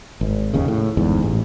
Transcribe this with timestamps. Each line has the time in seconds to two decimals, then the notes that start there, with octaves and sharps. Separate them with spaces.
0.21 G#1
0.54 F1 D#2 C#3
0.68 A2
0.97 G1 E2 G#2
1.22 A1